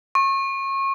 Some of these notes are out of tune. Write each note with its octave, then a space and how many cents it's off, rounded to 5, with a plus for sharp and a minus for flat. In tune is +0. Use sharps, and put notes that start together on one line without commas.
C#6 -30